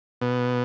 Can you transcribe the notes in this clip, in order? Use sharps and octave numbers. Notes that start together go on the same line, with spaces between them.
B2